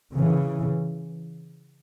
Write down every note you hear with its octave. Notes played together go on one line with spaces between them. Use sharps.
C#3 E3